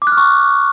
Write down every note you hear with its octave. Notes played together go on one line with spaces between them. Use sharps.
D6
F#6
F6
C#6